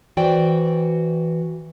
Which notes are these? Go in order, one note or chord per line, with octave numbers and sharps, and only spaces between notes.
E3 F#4 C5 D5 G5